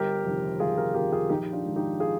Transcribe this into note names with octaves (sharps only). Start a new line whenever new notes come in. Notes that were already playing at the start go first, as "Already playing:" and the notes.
Already playing: G1 G4 A#4
F2 C3 D#3
G1 F4 G#4
G4 A#4
F2 C3 D#3 G4 A#4
F4 G#4
A#1 D#4 G4
D4 F4
G#2 D#3
D#4 G4
F4 G#4